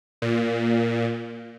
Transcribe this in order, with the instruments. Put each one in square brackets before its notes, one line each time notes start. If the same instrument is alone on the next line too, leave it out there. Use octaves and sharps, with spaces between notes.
[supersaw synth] A#2